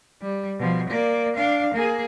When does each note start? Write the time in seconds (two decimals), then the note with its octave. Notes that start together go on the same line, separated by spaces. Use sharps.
0.22 G3
0.59 B2 F3
0.90 A#3 D5
1.36 D4 F5
1.74 A#3 G#4